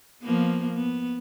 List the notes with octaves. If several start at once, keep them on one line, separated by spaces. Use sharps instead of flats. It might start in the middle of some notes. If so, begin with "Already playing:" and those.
F3 A#3 B3
B3